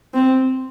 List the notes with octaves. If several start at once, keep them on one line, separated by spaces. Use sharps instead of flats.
C4